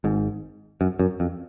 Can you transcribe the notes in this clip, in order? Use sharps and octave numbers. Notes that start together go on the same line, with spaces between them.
G#1 G#2
F#2
F#2
F2